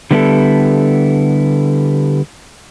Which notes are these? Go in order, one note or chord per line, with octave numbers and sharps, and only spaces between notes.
D3 G3 B3 D#4 E4 A4